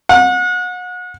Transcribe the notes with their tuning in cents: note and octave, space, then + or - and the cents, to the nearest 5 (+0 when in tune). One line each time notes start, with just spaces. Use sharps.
F#5 -35